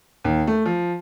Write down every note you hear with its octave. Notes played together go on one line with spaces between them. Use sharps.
D#2
A3
F3